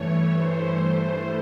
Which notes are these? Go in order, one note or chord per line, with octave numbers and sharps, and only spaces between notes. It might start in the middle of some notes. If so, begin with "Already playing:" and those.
Already playing: G2 E3 A3 C#5
C5
C5